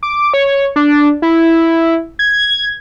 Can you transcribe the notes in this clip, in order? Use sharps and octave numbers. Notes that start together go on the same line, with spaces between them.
D6
C#5
D4
E4
G#6